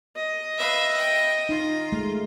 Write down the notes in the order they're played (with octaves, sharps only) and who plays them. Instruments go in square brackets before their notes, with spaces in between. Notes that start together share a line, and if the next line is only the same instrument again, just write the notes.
[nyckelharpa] D#5
[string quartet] B4 E5 F5
G5
[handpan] D#4 [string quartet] F4
[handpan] G#3 A3